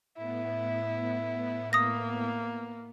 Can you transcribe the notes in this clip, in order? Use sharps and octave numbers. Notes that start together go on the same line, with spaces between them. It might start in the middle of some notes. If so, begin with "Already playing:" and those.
A2 B3 E4
A#3 D#6 A#6